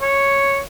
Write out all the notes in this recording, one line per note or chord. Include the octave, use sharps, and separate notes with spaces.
C#5